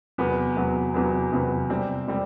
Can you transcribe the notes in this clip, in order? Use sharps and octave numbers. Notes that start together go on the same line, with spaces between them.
E2 C3 F#3 B3
E2 C3 F#3 B3
E2 C3 F#3 B3
E2 C3 F#3 B3
C3 G3 C4
C3 G3 C4